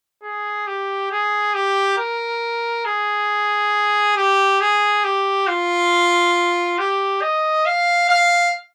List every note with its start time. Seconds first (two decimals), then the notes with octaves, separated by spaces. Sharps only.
0.23 G#4
0.67 G4
1.11 G#4
1.54 G4
1.98 A#4
2.85 G#4
4.16 G4
4.61 G#4
5.04 G4
5.47 F4
6.78 G4
7.22 D#5
7.66 F5
8.10 F5